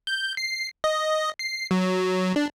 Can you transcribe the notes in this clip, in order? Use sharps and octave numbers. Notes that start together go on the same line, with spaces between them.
G6
C7
D#5
C7
F#3
D4